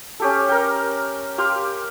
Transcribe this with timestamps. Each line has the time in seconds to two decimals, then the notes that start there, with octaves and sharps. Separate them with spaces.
0.20 C#4 G4 A4
0.49 A#4 G5
1.38 G4 F5 C6